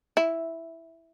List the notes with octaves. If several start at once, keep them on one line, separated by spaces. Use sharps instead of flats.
E4